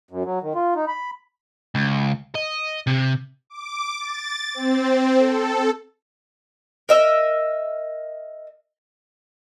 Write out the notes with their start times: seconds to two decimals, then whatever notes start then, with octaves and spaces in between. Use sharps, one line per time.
0.11 F#2
0.25 F#3
0.42 D#3
0.55 F4
0.76 D#4
0.88 B5
1.75 C#2
2.35 D#5
2.87 C3
3.50 D6
4.00 A6
4.54 C4
5.18 A4
6.89 A#4 D#5 E5